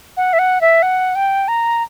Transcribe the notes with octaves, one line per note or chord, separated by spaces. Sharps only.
F#5
E5
F#5
E5
F#5
G5
A#5